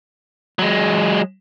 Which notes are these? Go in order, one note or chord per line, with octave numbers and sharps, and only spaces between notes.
F#3 G#3